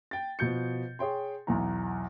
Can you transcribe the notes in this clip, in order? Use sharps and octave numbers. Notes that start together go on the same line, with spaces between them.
G5 A6
B2 F3 G6 C#7
G#4 C#5 G5 C6
B1 E2 A#5